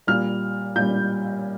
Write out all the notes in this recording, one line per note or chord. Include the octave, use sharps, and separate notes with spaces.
A#2 G3 F6
A#2 G3 G6